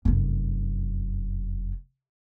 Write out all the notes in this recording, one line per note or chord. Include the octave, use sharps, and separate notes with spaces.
F1 F#2